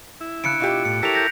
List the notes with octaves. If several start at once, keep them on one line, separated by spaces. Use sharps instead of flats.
E4
C#3 F#6 C#7 D7
B2 F4 G4
A2 C#7
E4 G4 A4 A#4 C#5 B6 D7 F7
G6 A#6